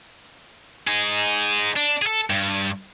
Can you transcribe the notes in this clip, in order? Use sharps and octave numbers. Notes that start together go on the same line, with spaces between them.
D#4 G#4
D4
G#4 A4
G2